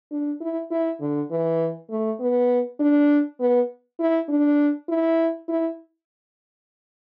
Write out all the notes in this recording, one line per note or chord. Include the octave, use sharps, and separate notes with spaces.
D4
E4
E4
D3
E3
A3
B3
D4
B3
E4
D4
E4
E4